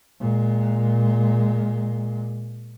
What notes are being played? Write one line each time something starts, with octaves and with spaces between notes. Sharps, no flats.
A#2 G#3